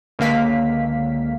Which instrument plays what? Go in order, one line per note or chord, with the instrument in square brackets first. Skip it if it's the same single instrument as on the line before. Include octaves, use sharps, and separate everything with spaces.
[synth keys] C#2 D3 A#3 F5 B6